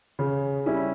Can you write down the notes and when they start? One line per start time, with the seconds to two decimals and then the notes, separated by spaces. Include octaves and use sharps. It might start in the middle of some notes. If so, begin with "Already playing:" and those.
0.19 C#3
0.66 G3 C#4 E4